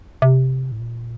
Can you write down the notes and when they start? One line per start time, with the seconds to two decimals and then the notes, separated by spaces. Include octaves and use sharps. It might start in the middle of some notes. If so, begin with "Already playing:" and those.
0.22 C3
0.72 A2
0.80 A#2